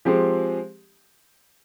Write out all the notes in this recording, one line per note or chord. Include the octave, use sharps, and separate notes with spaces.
F3 G#3 C4 G4